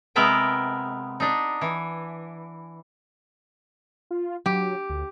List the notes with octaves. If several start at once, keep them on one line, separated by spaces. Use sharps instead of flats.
C3 G#3 B3 A#4 E5 G5
D4 D#4
E3
F4
F#3 G4
D2